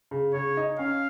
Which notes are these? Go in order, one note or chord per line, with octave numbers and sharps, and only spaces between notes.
C#3
C#3 C#5
D#4
C#4 F5